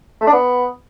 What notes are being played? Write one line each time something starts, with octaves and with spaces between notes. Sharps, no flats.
A3
D4
B3